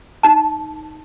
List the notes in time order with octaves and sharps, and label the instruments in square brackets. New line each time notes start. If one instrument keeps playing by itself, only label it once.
[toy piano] D#4 A5